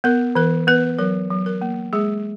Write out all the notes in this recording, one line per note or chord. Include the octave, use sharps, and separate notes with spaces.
B3 A#4
E3 A#4
B3 B4
F#3 A#4
F#3
A#4
A#3
G#3 G#4